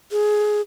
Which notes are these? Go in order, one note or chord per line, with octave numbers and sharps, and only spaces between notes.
G#4